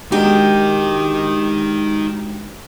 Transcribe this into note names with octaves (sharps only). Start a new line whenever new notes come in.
G#3 D4 D#4 F#4 G4 A#4